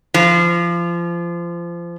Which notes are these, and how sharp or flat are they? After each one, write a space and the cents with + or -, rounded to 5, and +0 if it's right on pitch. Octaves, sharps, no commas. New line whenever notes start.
F3 -25